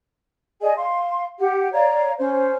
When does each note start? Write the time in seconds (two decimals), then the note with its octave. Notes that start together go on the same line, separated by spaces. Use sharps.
0.61 G#4 D5 D#5 G#5
0.76 F5 C6
1.38 G4 F#5
1.72 C#5 D5 F5 A#5
2.16 C#4 C5